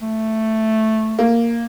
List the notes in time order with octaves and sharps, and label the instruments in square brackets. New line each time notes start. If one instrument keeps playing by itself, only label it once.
[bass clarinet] A3
[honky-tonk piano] A#3